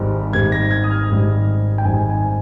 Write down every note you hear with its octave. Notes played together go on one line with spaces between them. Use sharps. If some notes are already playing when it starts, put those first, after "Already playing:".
Already playing: G#1 G#2 G3
G#1 G#2 G3 G#6
A#6
G#6
D#6
F6
G#1 G#2 G3
G5
G#1 G#2 G3 G#5
G#5